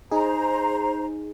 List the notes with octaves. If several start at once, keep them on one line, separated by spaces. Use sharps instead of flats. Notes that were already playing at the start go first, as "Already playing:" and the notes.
D#4 G#4 C5 A#5